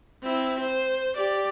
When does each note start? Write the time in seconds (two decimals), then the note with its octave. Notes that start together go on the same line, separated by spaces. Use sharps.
0.23 C4 E4
0.60 C5
1.16 G4 D5